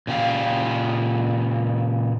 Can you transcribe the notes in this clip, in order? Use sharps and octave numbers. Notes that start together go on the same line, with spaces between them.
A#2 C#3 G4 F5